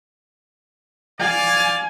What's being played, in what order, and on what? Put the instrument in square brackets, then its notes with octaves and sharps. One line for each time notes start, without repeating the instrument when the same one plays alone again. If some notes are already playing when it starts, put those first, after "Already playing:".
[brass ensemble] D5 F5 [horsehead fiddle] G#5